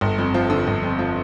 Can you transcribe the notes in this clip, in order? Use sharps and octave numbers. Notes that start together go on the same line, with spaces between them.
G1
F2
F3
D3
G1
F2
F3